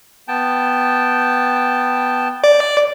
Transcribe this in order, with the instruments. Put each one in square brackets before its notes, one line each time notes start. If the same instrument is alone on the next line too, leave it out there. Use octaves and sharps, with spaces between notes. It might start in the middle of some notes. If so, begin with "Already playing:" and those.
[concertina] B3 G5 A5
[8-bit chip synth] D5